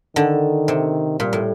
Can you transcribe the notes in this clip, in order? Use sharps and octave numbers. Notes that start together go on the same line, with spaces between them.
D3 D#3
C3
A#2 G3
A2